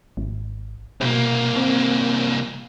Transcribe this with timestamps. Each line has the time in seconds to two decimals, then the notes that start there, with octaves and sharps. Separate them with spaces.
0.17 G#1
1.01 C2 B2 A#3
1.56 C4